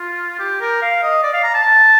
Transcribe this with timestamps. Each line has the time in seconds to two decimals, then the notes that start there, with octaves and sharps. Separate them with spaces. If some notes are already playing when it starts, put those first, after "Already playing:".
Already playing: F4
0.39 G4
0.61 A#4
0.82 F5
1.02 D#5
1.23 D5
1.33 F5
1.43 A#5
1.55 A5